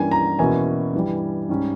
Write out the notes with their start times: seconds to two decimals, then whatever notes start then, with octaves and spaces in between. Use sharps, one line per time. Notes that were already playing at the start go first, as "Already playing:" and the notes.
Already playing: G2 E3 G3 A#3 C#4 G#5
0.11 A#5
0.39 E2 B2 A#3 C#4 E4 G#5
0.94 G2 E3 G3
1.49 G#2 G3 C#4